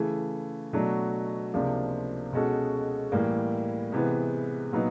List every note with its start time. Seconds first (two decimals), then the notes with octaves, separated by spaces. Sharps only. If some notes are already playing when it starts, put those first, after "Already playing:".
Already playing: C#3 E3 A3
0.73 B2 F#3 A3 D4 F#4
1.53 C#2 C3 F3 A#3 D4
2.32 B2 G#3 C#4 F#4 A4
3.12 A2 E3 G3 A#3
3.92 C3 E3 G#3 B3
4.72 A#2 F#3 B3 D#4